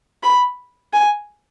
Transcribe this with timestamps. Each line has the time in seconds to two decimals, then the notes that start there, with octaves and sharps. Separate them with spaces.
0.23 B5
0.93 G#5